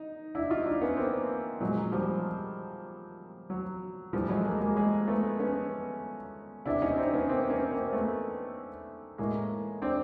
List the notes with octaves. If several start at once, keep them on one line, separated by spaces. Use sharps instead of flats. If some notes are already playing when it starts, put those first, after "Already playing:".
Already playing: D#4
D4 E4
D#4 F4
D4 E4
B3 C#4
A#3 C4
A#2 F3 F#3 G#3
F3 G3
F#3
A2 E3 F3 G3
F#3 G#3
G#3 A#3
G#3 A#3
G#3 A#3
A3 B3
B3 C#4
C3 E3 D4 E4
C#4 D#4
C4 D4
B3 C#4
A#3 C4
B3 C#4
A#3 C4
A3 B3
A2 E3 G#3 A#3
C4 D4